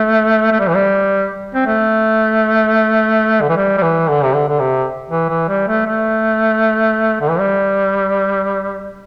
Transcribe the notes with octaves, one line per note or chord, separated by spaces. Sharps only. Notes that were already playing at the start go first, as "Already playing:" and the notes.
Already playing: A3
A3
G3
E3
G3
C4
A3
D3
E3
G3
G3
E3
D3
C3
D3
D3
C3
E3
E3
G3
A3
A3
D3
E3
G3